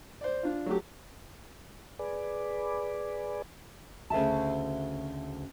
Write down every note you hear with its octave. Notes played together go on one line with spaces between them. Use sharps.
C5 D5
D4 F4
F#3 A3 G4
G#4 B4 D5
D2 C#3 E5 A5